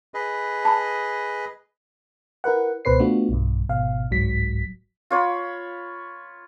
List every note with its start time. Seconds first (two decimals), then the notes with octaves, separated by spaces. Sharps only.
0.14 G#4 B4 D#5
0.65 A5 B5
2.44 E4 A#4 B4 F#5
2.85 C#2 B2 B4 C5 C7
2.99 A3 B3 D4 F4 F#4
3.29 B1 G2
3.69 G#1 B2 F5
4.11 G1 C2 G#2 F#3 B6
5.10 F4 C#5 B5